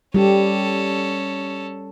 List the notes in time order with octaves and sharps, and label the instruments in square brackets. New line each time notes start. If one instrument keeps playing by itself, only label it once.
[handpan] G3 G4 [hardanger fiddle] C#4 A4